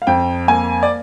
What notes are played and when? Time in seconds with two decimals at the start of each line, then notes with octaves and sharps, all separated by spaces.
0.02 F5
0.07 F2 G5
0.48 A#3 G#5
0.83 D5